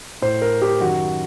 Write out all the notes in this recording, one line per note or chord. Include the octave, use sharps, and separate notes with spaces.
A2 C5
A#4
G4
F#2 D#3 F#4